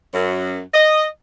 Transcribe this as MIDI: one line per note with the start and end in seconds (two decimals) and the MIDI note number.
0.14 0.61 42
0.74 1.06 75